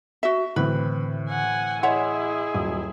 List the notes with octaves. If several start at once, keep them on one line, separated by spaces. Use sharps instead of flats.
F#4 E5
A2 D3 E3 C4 B4
F#5 G#5
E4 G#4 C#5 D#5 E5 F#5 G#5 C6
D#1 F#3 D#6